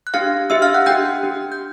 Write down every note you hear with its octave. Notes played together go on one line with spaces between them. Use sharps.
F#6
D4 G4 F5 F6
D4 G4 E5 E6
F5 F6
F#5 F#6
D4 G4 G5 G6
D4 G4
G6